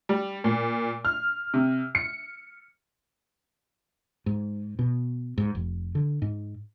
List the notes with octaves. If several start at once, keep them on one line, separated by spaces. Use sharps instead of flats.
G3
A#2
F6
C3
C#7
G#2
B2
G#2
F1
D3
G#2